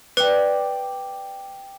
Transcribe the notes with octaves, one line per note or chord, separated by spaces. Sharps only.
B4 D5 G5